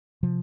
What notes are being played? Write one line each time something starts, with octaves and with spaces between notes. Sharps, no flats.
C3 F3